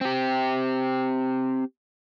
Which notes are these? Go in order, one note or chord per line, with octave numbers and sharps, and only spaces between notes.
C4 G4